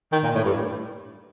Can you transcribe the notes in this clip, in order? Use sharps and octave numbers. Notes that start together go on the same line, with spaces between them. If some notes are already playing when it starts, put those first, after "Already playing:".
D#3
A#2
A2
G2